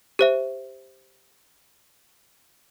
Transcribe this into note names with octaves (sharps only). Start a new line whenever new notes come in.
G4 C5 E5